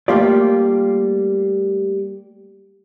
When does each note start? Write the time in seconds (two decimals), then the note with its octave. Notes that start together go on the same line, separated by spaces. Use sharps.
0.08 G3 A3 A#3 F4 G4 D5